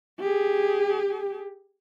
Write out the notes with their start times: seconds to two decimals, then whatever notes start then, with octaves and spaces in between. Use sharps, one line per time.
0.20 G4 G#4